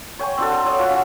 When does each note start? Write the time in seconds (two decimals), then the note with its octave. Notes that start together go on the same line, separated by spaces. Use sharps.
0.19 C#5 G5 G#5 C#6
0.37 C4 D4 F#4 A4
0.50 A4 C5
0.65 F#3 C#5 D#6
0.79 F4 C#5 F#5
0.90 C#4 F#4